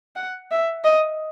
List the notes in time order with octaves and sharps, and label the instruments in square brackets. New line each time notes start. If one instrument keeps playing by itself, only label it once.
[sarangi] F#5
E5
D#5